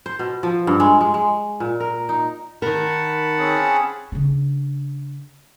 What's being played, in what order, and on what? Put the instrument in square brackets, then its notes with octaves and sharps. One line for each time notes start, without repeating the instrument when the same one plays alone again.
[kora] C5
B2
F3
G2
G#3
G#3
G#3
A#2
A#4
D#4
[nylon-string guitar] D#3 A#4 [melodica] F#5 A5 B5
[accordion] C4 C#4 G#4
[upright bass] C#3 D4